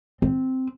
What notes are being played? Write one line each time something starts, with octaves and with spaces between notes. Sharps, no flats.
C4